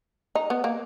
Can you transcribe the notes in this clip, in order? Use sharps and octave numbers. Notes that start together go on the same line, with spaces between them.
D#4
B3
A#3